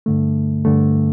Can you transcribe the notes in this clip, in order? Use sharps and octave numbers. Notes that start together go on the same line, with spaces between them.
G2 D3 A3
G2 D3 A3